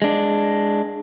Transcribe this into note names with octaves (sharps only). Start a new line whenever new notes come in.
G#3 D4